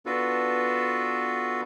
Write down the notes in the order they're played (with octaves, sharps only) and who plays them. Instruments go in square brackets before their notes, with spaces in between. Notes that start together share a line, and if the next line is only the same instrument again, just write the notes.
[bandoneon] B3 D4 F4 F#4 A4 B4